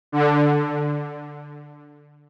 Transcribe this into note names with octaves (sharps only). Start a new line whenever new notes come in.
D3